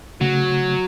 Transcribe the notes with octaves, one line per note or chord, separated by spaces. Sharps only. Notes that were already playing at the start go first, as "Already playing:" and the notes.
C#3 F#3 A3